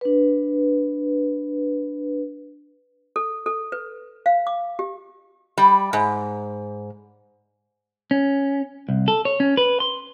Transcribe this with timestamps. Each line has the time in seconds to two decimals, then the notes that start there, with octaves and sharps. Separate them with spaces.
0.01 D4 B4
3.16 A4
3.46 A4
3.72 B4
4.26 F5
4.47 D6
4.79 G4
5.58 G3
5.93 G#2
8.11 C#4
8.89 C2
9.08 A4
9.25 C#5
9.40 C#4
9.57 B4
9.80 C6